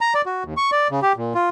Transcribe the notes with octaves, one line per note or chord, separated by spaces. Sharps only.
A#5
D5
F#4
D#2
C#6
D5
C#3
G4
A#2
F4